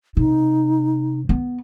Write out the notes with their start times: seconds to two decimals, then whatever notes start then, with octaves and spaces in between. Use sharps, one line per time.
0.17 C3 D#4
1.29 B3